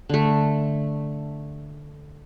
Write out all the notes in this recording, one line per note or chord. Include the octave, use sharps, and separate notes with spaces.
D3 A3